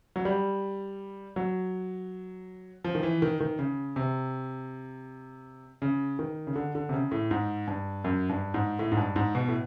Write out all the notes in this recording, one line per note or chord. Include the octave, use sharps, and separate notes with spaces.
F#3
G3
F#3
F3
D#3
E3
D#3
D#3
C#3
C3
C#3
D#3
C#3
D3
D3
C3
C#3
A2
G#2
G2
F#2
G2
G#2
A2
G#2
G2
G#2
B2
A2